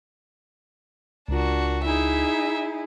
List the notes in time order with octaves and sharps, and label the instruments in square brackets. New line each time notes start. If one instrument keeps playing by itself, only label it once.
[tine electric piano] C#2 F4 [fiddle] D4 F#4 [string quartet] A#4
[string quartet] D#4 E4 G#4 [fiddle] E5